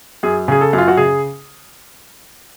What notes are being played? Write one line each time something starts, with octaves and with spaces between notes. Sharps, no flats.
F#2 G#4
C#3 G#4
A4
F#2
F4
F#4
C#3 G#4